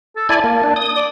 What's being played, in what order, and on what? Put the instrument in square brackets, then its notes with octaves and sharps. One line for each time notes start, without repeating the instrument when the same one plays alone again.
[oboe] A4
[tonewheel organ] E4 D5 G#5 [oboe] A5
[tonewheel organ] A#3
D4
D#6
[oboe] D5